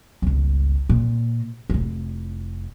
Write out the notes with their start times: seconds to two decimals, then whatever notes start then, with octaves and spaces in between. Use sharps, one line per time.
0.22 G1 C#2
0.89 A#2
1.70 F1 E4